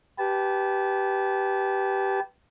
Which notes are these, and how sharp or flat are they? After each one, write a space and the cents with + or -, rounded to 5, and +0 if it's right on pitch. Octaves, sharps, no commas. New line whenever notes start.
G4 -10 B4 +0 A5 -30